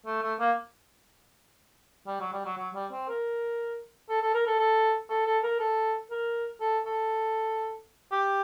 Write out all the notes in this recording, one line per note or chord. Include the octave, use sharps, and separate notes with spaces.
A3
A3
A#3
G3
F#3
G3
F#3
F#3
G3
C4
A#4
A4
A4
A#4
A4
A4
A4
A4
A#4
A4
A#4
A4
A4
G4